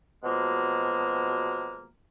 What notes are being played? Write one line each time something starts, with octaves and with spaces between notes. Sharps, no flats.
B2 F3 F#3 G#3 A#3